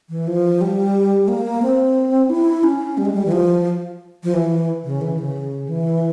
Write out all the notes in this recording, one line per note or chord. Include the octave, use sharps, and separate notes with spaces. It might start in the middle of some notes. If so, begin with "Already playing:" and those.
E3
F3
G3
A#3
C4
E4
C#4
G3
G#3
G3
E3
F3
F3
E3
C#3
E3
C#3
E3